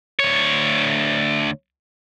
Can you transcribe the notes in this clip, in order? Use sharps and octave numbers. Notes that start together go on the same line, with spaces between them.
D2 C#5